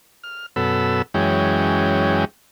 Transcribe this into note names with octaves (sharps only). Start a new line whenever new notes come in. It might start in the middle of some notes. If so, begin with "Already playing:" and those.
F6
F#2 B2 A4 B5 E6
F#2 E3 G#3 C#4 G5